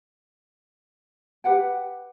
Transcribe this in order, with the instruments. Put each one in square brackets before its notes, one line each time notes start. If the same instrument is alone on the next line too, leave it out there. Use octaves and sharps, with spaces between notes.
[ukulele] G4 B4 F#5 G5